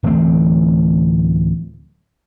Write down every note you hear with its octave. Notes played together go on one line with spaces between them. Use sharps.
D1 E3 A3 C4